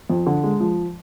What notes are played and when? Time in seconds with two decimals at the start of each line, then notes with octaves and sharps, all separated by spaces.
0.10 F2
0.26 D3
0.43 G#3
0.60 F3